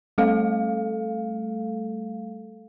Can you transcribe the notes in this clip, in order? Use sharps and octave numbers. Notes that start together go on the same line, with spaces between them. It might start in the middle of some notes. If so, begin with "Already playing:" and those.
G3 A3 A4 F5